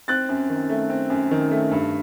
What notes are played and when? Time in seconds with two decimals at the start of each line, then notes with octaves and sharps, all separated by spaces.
0.08 C4 F#6 A6
0.29 F#2
0.50 D#3
0.70 A3
0.89 C4
1.10 F#2
1.31 D#3
1.51 A3
1.71 G2